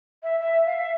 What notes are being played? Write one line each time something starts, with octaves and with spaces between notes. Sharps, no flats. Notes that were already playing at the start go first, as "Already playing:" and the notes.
E5
E5
F5
E5